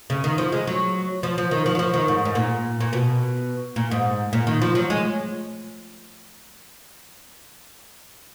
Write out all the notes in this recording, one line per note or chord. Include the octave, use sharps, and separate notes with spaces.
C#3
D#3
F3
G#3
F#3
F3
F3
D#3
F3
F#3
F3
D#3
G#2
G#2
A#2
A#2
B2
A#2
G#2
A#2
D#3
F3
F#3
G#3